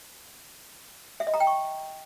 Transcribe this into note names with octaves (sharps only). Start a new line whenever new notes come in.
E5
D#5
A#5
G5
C#6